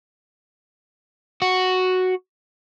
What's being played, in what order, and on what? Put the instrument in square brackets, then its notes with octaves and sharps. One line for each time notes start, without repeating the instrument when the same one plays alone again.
[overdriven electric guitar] F#4